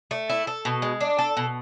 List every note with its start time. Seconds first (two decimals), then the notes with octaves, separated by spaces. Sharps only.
0.11 A3
0.29 E4
0.47 A4
0.65 B2
0.82 G#3
1.01 D4
1.19 A4
1.37 B2